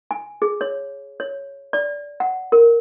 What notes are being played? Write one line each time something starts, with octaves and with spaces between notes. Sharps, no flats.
G#5
G#4
C#5
C#5
D5
F#5
A#4